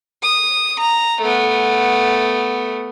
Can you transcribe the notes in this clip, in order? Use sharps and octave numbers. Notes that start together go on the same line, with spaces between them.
D#6
A#5
A3 B3